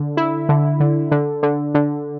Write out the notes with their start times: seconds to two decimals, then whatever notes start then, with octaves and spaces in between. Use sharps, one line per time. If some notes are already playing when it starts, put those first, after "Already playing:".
Already playing: D3
0.17 E4
0.49 D3
0.80 D3
1.11 D3
1.43 D3
1.74 D3